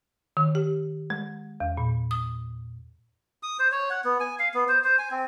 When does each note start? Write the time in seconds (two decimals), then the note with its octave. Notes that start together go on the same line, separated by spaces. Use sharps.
0.37 D#3
0.55 G4
1.10 G#3
1.60 E2
1.77 A#2
2.11 D#6
3.43 D#6
3.59 C5
3.72 C#5
3.90 F#5
4.04 B3
4.20 G#5
4.39 F5
4.54 B3
4.69 C5
4.84 C5
4.99 G#5
5.11 C4